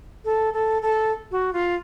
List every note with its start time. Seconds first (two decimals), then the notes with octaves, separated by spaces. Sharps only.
0.25 A4
0.53 A4
0.82 A4
1.31 F#4
1.53 F4